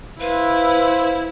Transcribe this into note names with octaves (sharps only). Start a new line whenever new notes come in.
E4 B4 C5 F5